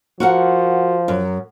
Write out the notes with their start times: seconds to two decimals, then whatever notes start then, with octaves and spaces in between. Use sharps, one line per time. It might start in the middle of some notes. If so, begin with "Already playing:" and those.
0.20 F3 F#4 A#4 F#5
1.08 F#2